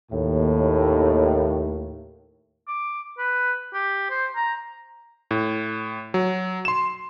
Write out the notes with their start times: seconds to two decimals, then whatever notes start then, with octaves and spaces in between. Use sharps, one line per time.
0.12 D#2 A2
2.68 D6
3.18 B4
3.73 G4
4.10 C5
4.36 A#5
5.31 A2
6.14 F#3
6.65 C6 E7